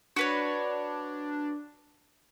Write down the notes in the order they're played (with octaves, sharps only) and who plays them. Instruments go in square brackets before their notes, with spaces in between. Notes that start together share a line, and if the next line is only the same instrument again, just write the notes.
[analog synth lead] D4 [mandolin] F#4 B4 C#5